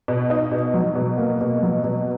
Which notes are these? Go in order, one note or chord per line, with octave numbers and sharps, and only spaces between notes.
B2
D#4
B2
F#3
B2
A#3
B2
F#3
B2